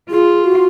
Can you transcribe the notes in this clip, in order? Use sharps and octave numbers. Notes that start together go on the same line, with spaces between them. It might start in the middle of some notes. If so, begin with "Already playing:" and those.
F4 G#4
F#4